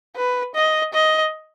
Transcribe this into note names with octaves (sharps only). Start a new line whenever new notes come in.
B4
D#5
D#5